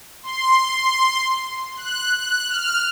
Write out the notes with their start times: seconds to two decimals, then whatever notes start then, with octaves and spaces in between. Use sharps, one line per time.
0.23 C6
1.77 F#6
2.19 F#6
2.49 F6